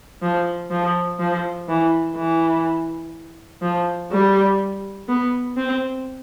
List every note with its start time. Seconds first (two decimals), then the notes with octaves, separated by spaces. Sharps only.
0.22 F3
0.71 F3
1.20 F3
1.68 E3
2.16 E3
3.62 F3
4.11 G3
5.08 B3
5.57 C4